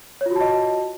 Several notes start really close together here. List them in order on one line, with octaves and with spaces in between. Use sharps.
C#5 F4 F#4 A5 D#5